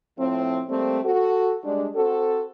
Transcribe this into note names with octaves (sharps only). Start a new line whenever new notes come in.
A2 F3 C4
G3 A3 A#3 C4
F#4 A4
G3 G#3 D4
C4 F#4 A4